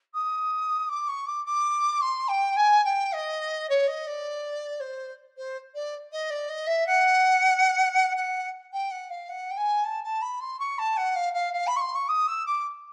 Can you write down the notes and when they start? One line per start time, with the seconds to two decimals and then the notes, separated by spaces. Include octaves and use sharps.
0.14 D#6
0.88 D6
1.07 C#6
1.26 D6
1.45 D6
2.01 C6
2.28 G5
2.56 G#5
2.84 G5
3.12 D#5
3.69 C#5
3.87 D#5
4.06 D5
4.80 C5
5.37 C5
5.74 D5
6.11 D#5
6.30 D5
6.48 D#5
6.66 E5
6.86 F#5
8.16 F#5
8.72 G5
8.90 F#5
9.09 F5
9.28 F#5
9.50 G5
9.57 G#5
9.84 A5
10.03 A5
10.21 B5
10.40 C6
10.59 C#6
10.78 A5
10.96 F#5
11.15 F5
11.33 F5
11.53 F5
11.66 B5
11.76 C#6
11.80 C6
11.94 C#6
12.08 D#6
12.27 E6
12.45 D6